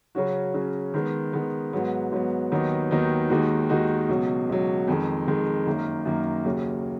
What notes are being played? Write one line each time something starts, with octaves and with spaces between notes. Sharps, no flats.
C#3 F#3 C#4 F#4
C#3 F#3 C#4 F#4
D#3 G#3 B3
D#3 G#3 B3
G#2 F#3 B3
G#2 F#3 B3
D#2 D#3 F#3 B3 D#4
D#2 D#3 F#3 B3 D#4
D#2 D#3 G#3 D#4 F#4
D#2 D#3 G#3 D#4 F#4
C#2 B2 F#3
C#2 B2 F#3
F2 D#3 G#3
F2 D#3 G#3
F#2 D#3 A#3
F#2 D#3 A#3
D#2 C#3 F#3